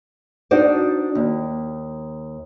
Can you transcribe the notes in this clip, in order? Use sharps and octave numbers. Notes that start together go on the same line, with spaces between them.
D4 D#4 F#4 C5 D5
D#2